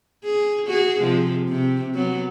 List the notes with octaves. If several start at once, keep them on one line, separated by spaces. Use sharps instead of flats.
G#4
F#4 G#4
C3 F3 G#3
C3
F#3 B3